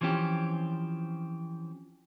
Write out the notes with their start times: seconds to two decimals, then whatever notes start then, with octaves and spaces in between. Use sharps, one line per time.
0.01 E3 F3 C4 C#4 G4